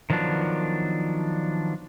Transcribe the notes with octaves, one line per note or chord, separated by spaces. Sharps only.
D#3 F3 F#3 B3 D4